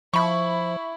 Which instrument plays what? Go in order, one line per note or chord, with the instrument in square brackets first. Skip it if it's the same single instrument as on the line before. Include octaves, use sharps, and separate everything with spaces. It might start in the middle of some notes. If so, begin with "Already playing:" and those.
[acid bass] F3 [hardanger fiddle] E4 [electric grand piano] B5 C#6